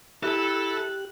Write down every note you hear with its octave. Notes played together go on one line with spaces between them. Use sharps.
E4 G4 A4 A5 F#6